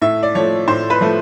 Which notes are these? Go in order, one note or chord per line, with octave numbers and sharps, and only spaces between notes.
A2 E5
D5
F3 A3 C#5
A2 C5
B4
F3 A3